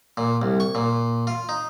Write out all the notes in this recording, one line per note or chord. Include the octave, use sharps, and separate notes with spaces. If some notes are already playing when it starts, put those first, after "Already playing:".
A#2
C2
C#6
A#2
F4
D#4